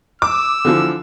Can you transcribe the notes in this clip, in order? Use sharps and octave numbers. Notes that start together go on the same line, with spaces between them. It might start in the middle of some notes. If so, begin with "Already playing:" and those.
D6 E6
D3 E3 F3